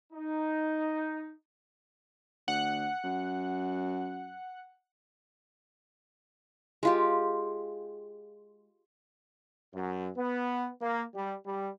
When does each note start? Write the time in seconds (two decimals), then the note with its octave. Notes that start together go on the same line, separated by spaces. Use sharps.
0.12 D#4
2.48 D2 F#5
3.04 F#2
6.83 G#3 F4 G4
9.74 F#2
10.17 B3
10.81 A#3
11.15 G3
11.45 G3